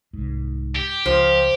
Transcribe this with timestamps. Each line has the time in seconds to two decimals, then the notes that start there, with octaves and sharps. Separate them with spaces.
0.13 C2 G#2
0.76 G4
1.06 C#2 F3